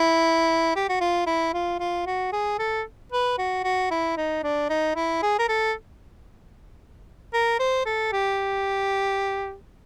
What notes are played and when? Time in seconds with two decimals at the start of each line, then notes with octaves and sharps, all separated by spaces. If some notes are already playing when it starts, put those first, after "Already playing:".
Already playing: E4
0.76 G4
0.89 F#4
1.00 F4
1.26 E4
1.54 F4
1.80 F4
2.06 F#4
2.33 G#4
2.59 A4
3.12 B4
3.38 F#4
3.64 F#4
3.91 E4
4.17 D#4
4.43 D4
4.69 D#4
4.96 E4
5.22 G#4
5.39 A#4
5.49 A4
7.34 A#4
7.60 C5
7.86 A4
8.12 G4